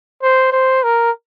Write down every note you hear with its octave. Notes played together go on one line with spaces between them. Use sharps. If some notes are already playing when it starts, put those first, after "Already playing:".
C5
C5
A#4